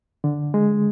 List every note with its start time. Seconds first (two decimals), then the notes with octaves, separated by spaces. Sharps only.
0.24 D3
0.54 G#3